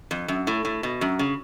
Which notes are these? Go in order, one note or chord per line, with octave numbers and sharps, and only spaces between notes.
F2
F#2
A2
A2
B2
F#2
C#3